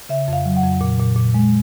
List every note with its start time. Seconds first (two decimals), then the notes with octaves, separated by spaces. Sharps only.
0.09 C#3 E5
0.28 F2 F5
0.45 F#3
0.57 F#5
0.63 F2
0.81 A#2
0.99 A#2
1.16 A#2
1.34 G#3